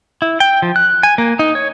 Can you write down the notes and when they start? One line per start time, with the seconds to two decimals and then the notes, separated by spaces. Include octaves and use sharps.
0.22 E4
0.40 G5
0.62 F3
0.76 F#6
1.03 G#5
1.18 A#3
1.39 D#4
1.55 C#5